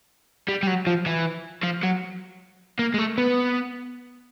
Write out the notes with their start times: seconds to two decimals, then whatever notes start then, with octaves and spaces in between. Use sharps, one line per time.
0.48 G3
0.63 G3
0.67 F#3
0.87 F3
1.06 E3
1.63 F3
1.83 F#3
2.79 A#3
2.94 G#3
2.98 A3
3.18 B3